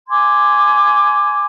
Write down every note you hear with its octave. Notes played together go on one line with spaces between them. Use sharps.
G#5 C6 D6 G#6